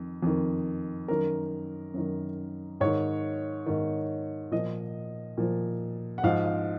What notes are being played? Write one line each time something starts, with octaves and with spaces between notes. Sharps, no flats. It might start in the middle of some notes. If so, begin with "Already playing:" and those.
Already playing: F2 D#3
F2 D#3
F#2 D#3 A#4
F#2 D#3
G#2 D#3 C#5
G#2 D#3
A#2 F3 D#5
A#2 F3
F#5
G#2 F3 F5
F5